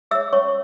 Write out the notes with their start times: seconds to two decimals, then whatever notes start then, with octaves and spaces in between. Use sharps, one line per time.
0.11 G#4 C#5 E5 E6
0.33 C#4 C#5 C#6